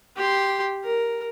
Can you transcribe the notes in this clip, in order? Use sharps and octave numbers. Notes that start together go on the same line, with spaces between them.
G4 C6
A#4